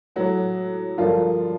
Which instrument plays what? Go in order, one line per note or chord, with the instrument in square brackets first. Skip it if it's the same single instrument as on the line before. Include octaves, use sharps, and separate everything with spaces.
[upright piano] A2 F#3 A3 F#4
G2 D3 F3 G3 A#3 F4